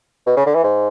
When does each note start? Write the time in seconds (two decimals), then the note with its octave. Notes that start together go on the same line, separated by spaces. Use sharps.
0.26 B2
0.37 C#3
0.46 D3
0.55 E3
0.64 G#2